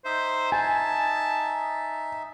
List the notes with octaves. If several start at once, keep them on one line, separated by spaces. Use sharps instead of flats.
D#4 C5 E5
G#5 A5